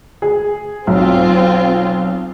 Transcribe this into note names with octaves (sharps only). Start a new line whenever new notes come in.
G#4
B1 C4 F4